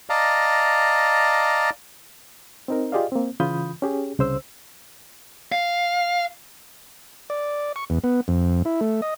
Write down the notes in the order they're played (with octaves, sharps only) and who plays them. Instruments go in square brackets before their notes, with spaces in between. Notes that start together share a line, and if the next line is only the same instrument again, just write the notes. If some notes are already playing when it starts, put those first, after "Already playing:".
[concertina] D5 D#5 F5 A5 A#5
[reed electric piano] C4 D#4 A#4
F4 G4 G#4 D5 D#5 F5
A#3 C4
C#3 E3 F4 B5 D#6 G6
C#4 G4 G#4
C2 C#3 C5 E6
[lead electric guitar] F5
[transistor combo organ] D5
C#6
E2
B3
F2
E4
A3
D#5